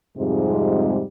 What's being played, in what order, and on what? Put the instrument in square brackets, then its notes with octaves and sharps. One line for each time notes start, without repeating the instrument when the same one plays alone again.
[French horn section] F2 G#2 C3 G3 G#3